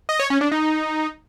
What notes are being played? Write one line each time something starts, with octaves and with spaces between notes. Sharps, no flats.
D#5
C#5
C#4
D4
D#4